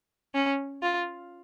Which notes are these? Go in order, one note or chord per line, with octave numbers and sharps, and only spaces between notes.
C#4
F4